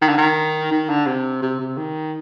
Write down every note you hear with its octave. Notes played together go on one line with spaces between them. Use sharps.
D#3
D3
D#3
D#3
D3
C3
C3
C3
D#3